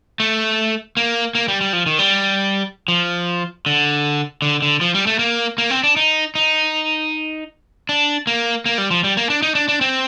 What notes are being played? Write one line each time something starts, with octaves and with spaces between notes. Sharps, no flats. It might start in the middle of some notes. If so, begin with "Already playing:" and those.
A3
A#3
A#3
G3
G3
F3
D#3
G3
F3
D3
D3
D3
F3
G3
A3
A#3
A#3
C4
D4
D#4
D#4
D4
A#3
A#3
G3
F3
G3
A#3
D4
D#4
D4
D4
C4